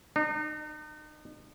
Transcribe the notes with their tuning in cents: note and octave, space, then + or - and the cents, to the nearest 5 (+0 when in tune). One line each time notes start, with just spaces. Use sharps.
D#4 -40